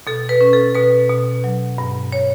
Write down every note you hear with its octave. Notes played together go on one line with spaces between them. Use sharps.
B2 A4
B4
C#4
A4
B2 B4
B2
F#3
G2
C#5